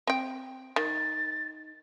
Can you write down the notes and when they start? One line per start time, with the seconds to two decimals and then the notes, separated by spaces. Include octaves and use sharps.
0.07 C4 G5
0.76 D#3 A6